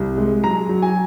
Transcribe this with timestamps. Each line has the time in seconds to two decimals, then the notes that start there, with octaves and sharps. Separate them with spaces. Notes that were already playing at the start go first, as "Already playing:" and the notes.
Already playing: C2
0.18 G#3
0.44 F#3 A#5
0.69 F#3
0.82 G#5